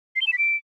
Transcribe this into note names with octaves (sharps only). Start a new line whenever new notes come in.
C7
G7
E7
B6
D7